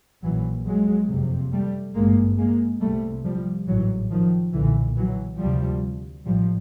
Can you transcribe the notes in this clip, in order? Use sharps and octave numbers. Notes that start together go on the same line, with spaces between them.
A#1 A#2 E3 F#3
F#3 G#3
F#1 F2 C3
G3 A3
G#1 G2 G#3 A#3
G#3 A#3
C2 C3 G3 A3
F3 G3
A1 G#2 E3 F#3
D#3 F3
B1 A#2 D3 E3
E3 F#3
D2 C3 F3 G3
A1 A2 F3 G3